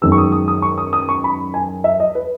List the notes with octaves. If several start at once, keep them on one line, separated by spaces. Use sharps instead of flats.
F#2 D#3 G#3 B3 E6
C#6
D#6
D#6
D#6
C#6
D#6
D#6
C#6
B5
G#5
E5
D#5
B4